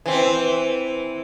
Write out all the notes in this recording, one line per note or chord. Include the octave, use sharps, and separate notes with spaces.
E3 C4